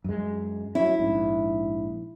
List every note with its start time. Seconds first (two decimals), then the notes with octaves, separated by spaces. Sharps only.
0.04 F#2 G#3
0.75 F#3 C#4 E4
0.99 A#1 G#2